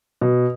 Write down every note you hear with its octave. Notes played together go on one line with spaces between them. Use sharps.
B2